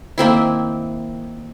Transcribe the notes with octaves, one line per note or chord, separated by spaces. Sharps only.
D#3 A#3 C4 E4